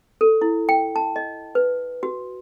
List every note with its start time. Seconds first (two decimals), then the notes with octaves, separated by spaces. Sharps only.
0.21 A4
0.41 E4
0.69 G5
0.96 A5
1.16 D#5
1.55 B4
2.03 F#4